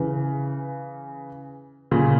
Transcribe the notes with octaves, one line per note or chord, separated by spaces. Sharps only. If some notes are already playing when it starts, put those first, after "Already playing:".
Already playing: C#3 E3
A#2 C#3